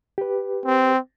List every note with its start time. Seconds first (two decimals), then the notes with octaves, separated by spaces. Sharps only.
0.18 G4 B4
0.66 C4